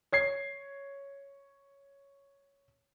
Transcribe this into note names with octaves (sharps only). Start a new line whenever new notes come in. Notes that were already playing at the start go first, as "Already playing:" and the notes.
C#5 G#6 C7